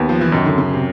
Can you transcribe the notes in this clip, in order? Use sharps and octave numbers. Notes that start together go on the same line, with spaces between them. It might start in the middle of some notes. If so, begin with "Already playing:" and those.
Already playing: D#2 B3
F3
E3
F#2 D#3
D3
C#3
C3